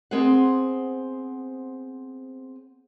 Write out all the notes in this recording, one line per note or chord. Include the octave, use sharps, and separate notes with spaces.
B3 C4 G#4 C5 F#5